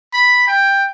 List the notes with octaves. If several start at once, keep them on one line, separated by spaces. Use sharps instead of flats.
B5
G5